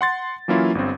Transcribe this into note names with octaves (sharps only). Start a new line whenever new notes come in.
F#5 C6 A6
E3 F#3 A#3 C#4 E4 F4
G1 G2 C4